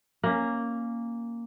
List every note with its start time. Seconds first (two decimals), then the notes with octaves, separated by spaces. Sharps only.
0.23 A#3 C#4